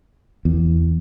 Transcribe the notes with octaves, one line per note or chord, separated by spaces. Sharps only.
E2